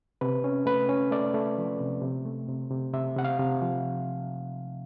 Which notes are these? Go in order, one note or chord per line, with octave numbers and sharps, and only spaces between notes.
C3 B4
C#4
A3 B4
C#4
A3 D5
A3
F3
C3
C3
A3
C3
C3
C3 E5
C3 F#5
F5
C3
F3